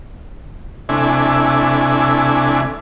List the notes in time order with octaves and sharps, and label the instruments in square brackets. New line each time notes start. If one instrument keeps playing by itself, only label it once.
[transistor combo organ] C3 A3 D4 E4 G#5